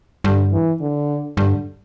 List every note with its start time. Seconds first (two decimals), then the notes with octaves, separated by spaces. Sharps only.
0.24 G2 D3
0.52 E3
0.81 D3
1.37 G2 D3